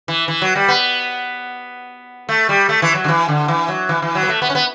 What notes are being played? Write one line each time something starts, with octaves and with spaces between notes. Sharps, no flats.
E3
E3
F#3
G3
B3
A3
G3
A3
E3
F#3
D3
E3
D3
E3
F#3
E3
E3
F#3
B3
A3
B3
C#4
B3